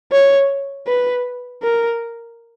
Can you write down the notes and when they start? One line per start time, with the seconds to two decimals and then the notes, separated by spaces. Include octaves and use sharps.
0.12 C#5
0.87 B4
1.63 A#4